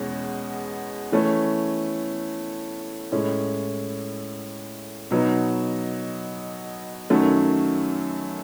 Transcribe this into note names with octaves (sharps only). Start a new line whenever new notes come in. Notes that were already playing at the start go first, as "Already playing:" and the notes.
Already playing: E2 B2 G#3 C#4
E3 A3 C#4
A2 G#3 C#4 E4
B2 F#3 B3 D#4
F#2 D#3 F#3 A3 C#4